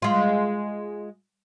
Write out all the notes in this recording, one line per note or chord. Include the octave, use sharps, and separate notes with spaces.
G#3 F4